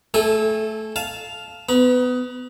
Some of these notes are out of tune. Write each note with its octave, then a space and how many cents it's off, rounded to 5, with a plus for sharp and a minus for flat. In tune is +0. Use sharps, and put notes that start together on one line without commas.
A3 +0 A4 -25 G#5 -25
F5 +0 A5 -20
B3 +25 B5 -40